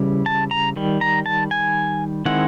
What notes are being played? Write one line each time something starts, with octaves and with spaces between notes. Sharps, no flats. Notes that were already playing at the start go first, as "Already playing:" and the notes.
Already playing: C#3 E3 G3
A5
A#5
D#3 G3
A#5
A5
G#5
D#3 G#3 C4 E4 F#5